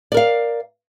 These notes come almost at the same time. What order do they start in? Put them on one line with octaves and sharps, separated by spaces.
D5 A#4 F5